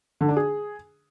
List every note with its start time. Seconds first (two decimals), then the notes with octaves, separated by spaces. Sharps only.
0.21 D3
0.29 D4
0.36 G#4